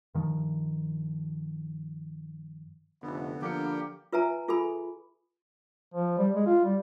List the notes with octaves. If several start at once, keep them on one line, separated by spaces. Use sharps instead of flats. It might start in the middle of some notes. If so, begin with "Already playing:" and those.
G2 D#3 F3
F1 D3 B3
D3 F3 A#3 D4 G4 C#7
F4 B4 E5 G#5 A#5
F4 G#4 A4 G#5 B5
F3
G3
G#3
F4
G3